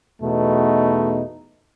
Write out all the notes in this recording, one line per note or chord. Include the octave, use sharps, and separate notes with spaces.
E2 B2 A3 D#4